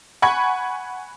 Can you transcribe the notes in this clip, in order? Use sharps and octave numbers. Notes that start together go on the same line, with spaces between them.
F#5 G#5 B5 C#6 G#6